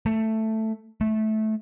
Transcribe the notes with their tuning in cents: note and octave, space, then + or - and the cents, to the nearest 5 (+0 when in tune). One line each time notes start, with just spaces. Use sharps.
A3 +5
A3 -15